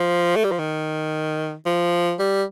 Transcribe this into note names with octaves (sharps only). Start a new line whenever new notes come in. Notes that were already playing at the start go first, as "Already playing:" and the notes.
Already playing: F3
A3
G3
F3
D#3
F3
G3